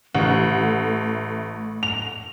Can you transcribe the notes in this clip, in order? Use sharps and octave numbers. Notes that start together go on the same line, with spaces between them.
A1 A3
F7